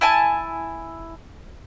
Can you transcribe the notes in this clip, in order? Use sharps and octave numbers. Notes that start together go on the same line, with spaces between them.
E4 G#5 A5